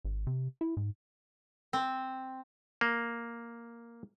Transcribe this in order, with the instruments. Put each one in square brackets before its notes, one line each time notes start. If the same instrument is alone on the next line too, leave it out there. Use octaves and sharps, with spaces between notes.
[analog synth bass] G#1
C3
E4
G#2
[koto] C4
[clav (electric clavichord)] A#3